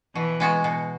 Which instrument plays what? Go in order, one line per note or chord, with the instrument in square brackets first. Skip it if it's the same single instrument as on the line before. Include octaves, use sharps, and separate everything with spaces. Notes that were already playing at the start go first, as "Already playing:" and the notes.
[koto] B2 [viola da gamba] E3
[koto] G#3 B3 F#4
B2